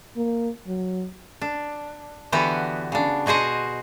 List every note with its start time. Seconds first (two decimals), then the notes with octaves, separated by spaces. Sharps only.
0.17 A#3
0.67 F#3
1.41 D4
2.32 D3 E3 B3 F#4 G4
2.92 C#3 D4
3.26 B2 F#4 G#4 C5 D#5